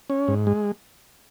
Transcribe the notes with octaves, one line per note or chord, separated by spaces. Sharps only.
C#4
G#2
G#3